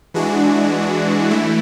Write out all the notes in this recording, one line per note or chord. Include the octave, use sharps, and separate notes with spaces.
E3 G#3 D4 F#4
E3 A3 E4